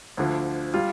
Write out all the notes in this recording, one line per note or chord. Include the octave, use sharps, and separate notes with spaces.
D2 D3 F3
G3 F4